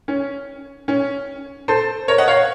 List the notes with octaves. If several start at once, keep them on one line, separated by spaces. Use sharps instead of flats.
C#4
C#4
A4 C5
A#4 C#5
D#5 F#5
C#5 F5